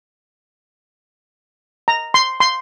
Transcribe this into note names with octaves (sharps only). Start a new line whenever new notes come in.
A#5
C6
C6